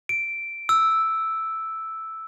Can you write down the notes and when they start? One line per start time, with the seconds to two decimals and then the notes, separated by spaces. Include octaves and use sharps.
0.09 D7
0.69 E6